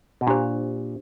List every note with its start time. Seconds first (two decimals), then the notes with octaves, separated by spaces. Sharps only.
0.21 B2
0.27 A#2 D4 G4 C5